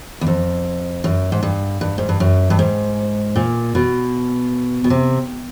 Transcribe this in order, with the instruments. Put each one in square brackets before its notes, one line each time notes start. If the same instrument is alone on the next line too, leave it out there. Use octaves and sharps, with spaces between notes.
[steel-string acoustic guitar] E2
F2
F#2
G#2
G2
G2
G#2
G2
F#2
G2
G#2
A#2
B2
B2
C3